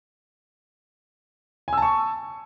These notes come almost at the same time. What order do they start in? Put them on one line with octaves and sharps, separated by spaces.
G#5 E6 A5 C#6